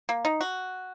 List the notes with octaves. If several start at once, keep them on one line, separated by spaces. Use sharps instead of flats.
A#3
D#4
F#4